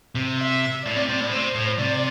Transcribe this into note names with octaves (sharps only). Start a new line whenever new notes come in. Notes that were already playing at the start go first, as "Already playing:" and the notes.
C3
E5
A2 D5
C3
C3
A2
C3 C5
A2
C3 D5